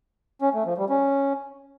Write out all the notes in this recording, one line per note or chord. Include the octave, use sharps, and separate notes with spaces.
C#4
A3
F3
G3
C#4